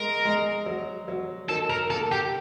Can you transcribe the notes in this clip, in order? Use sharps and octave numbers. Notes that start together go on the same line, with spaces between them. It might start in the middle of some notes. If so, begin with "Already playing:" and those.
Already playing: D#3 G#3 A#4
G#3
F#3
F#3
D#3 A4
A#4
A#3 A4
G4